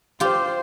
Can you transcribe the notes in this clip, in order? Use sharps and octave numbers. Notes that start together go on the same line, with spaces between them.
F4 G4 C5